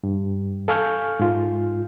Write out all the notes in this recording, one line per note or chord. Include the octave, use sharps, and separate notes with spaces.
G2
A4 F5 G#5 C#6 F6 G6
G#2 F4